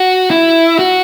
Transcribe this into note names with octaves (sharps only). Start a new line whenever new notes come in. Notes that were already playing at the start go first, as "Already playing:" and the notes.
Already playing: F#4
E4
F#4